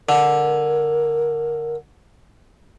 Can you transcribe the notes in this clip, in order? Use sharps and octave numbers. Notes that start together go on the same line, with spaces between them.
D3 A#4